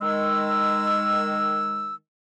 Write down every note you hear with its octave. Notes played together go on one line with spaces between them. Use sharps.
D#3 G#3 E6